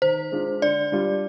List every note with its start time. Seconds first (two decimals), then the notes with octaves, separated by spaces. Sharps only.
0.02 D#3 C5
0.32 G#3 D4 F4
0.62 D3 D5
0.92 G3 D4 F4